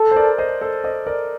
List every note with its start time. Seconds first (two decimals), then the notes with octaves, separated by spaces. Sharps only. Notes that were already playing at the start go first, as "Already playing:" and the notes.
Already playing: A4
0.11 C5
0.16 A#4 D5
0.38 C5 D#5
0.61 A4 C5
0.84 C5 D#5
1.06 A#4 D5